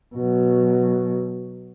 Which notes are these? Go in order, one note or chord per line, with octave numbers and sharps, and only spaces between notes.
B2 F#3